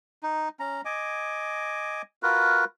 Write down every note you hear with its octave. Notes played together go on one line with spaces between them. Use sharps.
D#4
C#4 A#5
D#5 G#5 D6
F4 F#4 A#4 B4